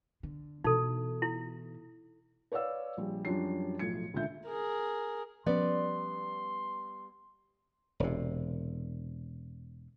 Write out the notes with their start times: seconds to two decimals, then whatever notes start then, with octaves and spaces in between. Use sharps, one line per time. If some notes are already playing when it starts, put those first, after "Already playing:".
0.23 D3
0.64 B2 E3 D#4 A4
1.22 E4
2.52 B4 C#5 D5 F5 E6
2.97 A#1 G3
3.25 F#2 F3 G3 D4 C#5 C7
3.79 B1 A2 F3 G#6 C#7
4.14 C#2 A#2 D3 G#3 E5 G6
4.46 G#4 A#4
5.46 F3 G3 B3 C#4 D5 C6
8.00 E1 C3